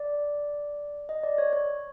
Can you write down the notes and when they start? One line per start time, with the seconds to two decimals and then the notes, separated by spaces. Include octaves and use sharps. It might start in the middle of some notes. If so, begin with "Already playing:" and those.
Already playing: D5
1.09 D#5
1.24 D5
1.38 C#5
1.53 C#5